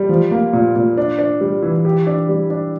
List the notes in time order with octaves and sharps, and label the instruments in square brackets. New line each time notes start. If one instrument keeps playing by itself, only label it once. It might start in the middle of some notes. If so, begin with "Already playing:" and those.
Already playing: [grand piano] G3
F3
A#3
A#2
A#2
D4
D4
G3
E3
G4
D4
G3
D4